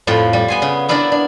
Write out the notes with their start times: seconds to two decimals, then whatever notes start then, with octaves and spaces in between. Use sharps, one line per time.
0.07 F2 A2 F3
0.33 G3
0.48 B3 G#5 C6
0.62 C#3
0.89 B3 D4 E4 A#4 D5
1.12 D4